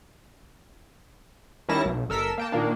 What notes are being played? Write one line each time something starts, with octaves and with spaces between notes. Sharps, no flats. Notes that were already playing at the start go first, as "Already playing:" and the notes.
D#3 G3 C#4 E4 A5 A#6
B1
G1 A4 A#4 E6 B6
A#3 G5 A5
A#2 D#3 A#3 D4